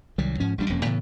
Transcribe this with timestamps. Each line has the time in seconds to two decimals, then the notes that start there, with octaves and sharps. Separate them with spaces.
0.18 C2 D#3 F#3 G3
0.40 G#2 F3 C#4
0.58 A1 G3 C#4 D4
0.69 E1 F2 A#3 C#4
0.85 A2 C#3 E3 B3